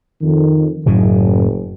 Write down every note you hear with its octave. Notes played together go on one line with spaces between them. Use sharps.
F2 D#3
F#1 F#2 A2 C#3